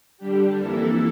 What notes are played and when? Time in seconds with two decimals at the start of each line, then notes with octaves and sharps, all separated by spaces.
0.18 D3 G3 D4 G4
0.58 F2 E3 A#3 E4 A4